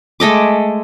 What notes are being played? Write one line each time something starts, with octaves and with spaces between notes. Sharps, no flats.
G#3 A3 D#5 D6